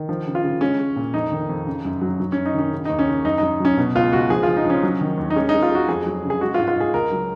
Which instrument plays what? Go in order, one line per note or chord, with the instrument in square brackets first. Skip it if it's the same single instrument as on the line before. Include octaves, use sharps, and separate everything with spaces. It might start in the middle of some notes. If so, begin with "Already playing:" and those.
Already playing: [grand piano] D#3
F3
C#3
F4
C#3
G#3 C#4
G#3
A#2
F2 D#4
D#3
F2
C#3
F#2
F#3
F#3
C#4
F#2
D#4
D#3 C#4
C#3
D#4
D#2
C#4
C#3
F#2 D#4
D#4
F#2
F#3 C#4
B2
C#2 F4
C#2 F#4
F3 G#4
F4
F3
D#4
F3 C#4
F#3
D#3
D#2
D#4
G#3 C#4
D#4
G#3
F4
G#3 F#4
F2 G#4
F#3
C#3
G#4
G#3 F#4
F4
G#2
F4
G#2 G#4
C#2 A#4
F#3